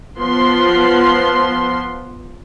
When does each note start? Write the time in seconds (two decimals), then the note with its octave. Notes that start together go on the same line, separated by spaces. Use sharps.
0.19 F3 B3 C6